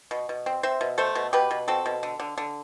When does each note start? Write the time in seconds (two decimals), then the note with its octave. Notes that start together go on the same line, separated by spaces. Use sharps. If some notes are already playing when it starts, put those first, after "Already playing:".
0.11 B2
0.29 B2
0.46 C4
0.63 C4 C5 E5
0.81 B2
0.98 A3 A4 C5
1.15 B2
1.33 B2 G4 B4
1.51 B2
1.68 C4 F#4 A4
1.86 B2
2.03 D3
2.20 D3
2.38 D3